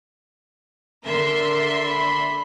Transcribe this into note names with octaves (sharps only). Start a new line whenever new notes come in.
D3 A#4 E5 C6
B5